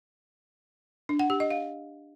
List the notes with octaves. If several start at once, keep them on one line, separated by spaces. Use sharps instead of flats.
D4
F#5
G4
D#5
F5